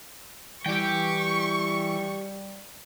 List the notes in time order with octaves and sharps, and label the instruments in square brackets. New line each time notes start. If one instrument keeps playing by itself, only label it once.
[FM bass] E3 [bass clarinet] G3 [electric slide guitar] G4 G5 [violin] C#6